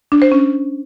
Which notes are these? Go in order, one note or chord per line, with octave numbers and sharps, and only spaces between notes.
D4
C5
C#4